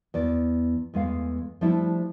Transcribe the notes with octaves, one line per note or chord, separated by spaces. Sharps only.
E2 D5
E2 G#3 A3 F5
F3 G3 A3 D4 E4